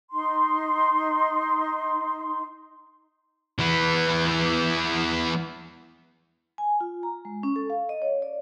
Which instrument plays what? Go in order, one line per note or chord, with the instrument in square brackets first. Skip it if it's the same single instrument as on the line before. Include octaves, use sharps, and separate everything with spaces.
[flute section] D#4 C6
[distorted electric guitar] E3 B3
[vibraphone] G#5
F4
A#5
G#3
C#4
A4
F5
D#5
C#5
D5